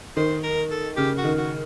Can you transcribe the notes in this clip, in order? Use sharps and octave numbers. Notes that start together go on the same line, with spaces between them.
D#3 C5
A#4
A4
C#3 G4
F#4
D#3
F#4